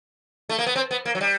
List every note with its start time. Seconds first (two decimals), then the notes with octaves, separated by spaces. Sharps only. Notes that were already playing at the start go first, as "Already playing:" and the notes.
0.49 A3
0.59 A#3
0.66 B3
0.76 C4
0.91 B3
1.06 A#3
1.15 F#3
1.21 G3